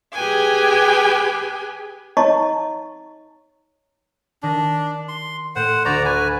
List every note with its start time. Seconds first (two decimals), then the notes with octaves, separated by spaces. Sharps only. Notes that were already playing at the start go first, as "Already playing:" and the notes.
0.14 G4 G#4 B4 G5 G#5
2.17 D#4 C#5 D#5 A5 A#5 C#6
4.43 D#3 D4 D#6 A#6
5.08 C6
5.55 A2 C5 F#5
5.85 D2 F#4 D5 A#5
6.05 B4 G#5